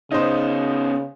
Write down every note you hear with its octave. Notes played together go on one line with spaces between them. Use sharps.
C#3 B3 C#4 D#4 C5